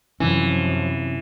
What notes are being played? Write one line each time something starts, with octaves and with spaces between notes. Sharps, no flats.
F#2 C3 E3 F3 C#4